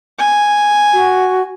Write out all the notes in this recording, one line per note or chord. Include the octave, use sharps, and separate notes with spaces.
G#5
F#4